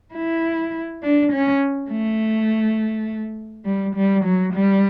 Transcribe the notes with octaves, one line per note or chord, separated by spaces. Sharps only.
E4
D4
C#4
A3
G3
G3
F#3
G3